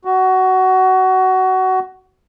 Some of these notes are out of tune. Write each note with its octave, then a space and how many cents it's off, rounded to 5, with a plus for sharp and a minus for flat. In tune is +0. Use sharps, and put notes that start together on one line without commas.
F#4 +20